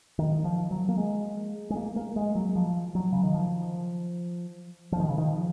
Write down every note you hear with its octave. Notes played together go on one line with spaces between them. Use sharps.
D#3
F3
F#3
A#3
G#3
G#3
A#3
A#3
G#3
F#3
F3
F#3
C#3
D#3
F3
F3
D#3
C#3
D#3
F3